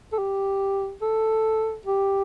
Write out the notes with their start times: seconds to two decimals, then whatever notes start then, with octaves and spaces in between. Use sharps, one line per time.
0.13 A4
0.18 G4
1.02 A4
1.86 G4